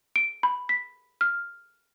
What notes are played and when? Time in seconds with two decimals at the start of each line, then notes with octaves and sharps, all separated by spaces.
0.16 D7
0.43 B5
0.69 B6
1.21 F6